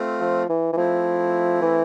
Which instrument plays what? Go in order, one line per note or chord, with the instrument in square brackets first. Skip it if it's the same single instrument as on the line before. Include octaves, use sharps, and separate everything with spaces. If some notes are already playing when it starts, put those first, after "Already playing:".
Already playing: [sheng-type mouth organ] A3 C4 F4
[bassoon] F3
E3
E3
[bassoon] F3 [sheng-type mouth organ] A3 C4 E4
[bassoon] E3